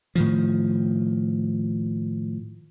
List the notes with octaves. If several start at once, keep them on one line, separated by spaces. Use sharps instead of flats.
A2 D#3 F3